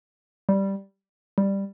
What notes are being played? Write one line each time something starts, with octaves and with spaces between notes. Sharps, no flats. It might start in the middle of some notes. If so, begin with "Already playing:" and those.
G3
G3